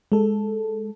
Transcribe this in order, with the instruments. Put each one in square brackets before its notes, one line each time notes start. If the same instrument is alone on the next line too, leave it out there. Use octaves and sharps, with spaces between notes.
[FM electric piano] G#3 A4